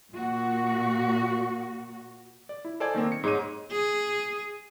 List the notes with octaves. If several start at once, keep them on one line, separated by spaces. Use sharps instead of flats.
A#2 F#4
D5
E4
A4 C5 D5 D#5 G#5 G#6
D#3 A#3 C4
C#7
G#2 G#3 C#5 D#7
G#4